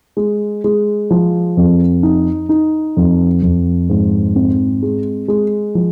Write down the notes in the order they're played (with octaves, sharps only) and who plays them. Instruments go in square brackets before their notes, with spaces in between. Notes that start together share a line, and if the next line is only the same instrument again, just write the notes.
[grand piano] G#3
G#3
F3
F2
D#4
D#4
F2
F2
G#2
C4
G#3
G#3
F3